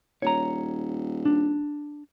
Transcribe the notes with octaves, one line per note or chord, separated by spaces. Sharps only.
D#1 C#5 A#5
D4